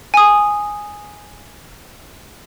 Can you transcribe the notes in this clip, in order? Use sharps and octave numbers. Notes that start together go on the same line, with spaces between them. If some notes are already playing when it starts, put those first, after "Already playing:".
G#5 D#6